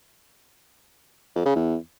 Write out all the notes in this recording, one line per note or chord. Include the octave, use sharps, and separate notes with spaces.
F2
C#3
E2